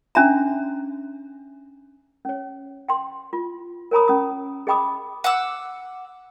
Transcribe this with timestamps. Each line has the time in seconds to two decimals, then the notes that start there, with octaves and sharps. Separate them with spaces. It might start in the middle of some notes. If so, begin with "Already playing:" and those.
0.15 C#4 D4 E5 A#5
2.25 C#4 C#5
2.89 G5 C6
3.33 F4
3.91 A#4 C#5 G#5 A#5 B5 D#6
4.08 C#4 D#6
4.67 G#4 D#5 G5 B5 D6 D#6
5.24 F#5 D6 E6